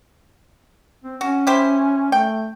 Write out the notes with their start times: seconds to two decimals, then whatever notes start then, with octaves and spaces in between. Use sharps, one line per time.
1.04 C4
1.21 C#4 F#4
1.47 E4 G4 C5
2.12 A3 G5